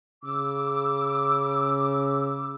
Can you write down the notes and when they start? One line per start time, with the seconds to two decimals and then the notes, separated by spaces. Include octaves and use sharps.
0.24 C#3 D6 E6